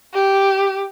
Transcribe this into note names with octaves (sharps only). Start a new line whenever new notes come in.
G4